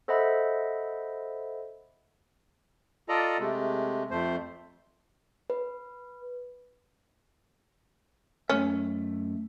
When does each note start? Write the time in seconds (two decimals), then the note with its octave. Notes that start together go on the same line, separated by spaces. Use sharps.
0.08 A4 C5 D#5 E5 F#5 B5
3.09 F4 A4 D5 D#5 A#5
3.39 C3 G#3 A3
4.11 F2 A3 C5
5.50 B4
8.50 F#2 A3 C#4 E5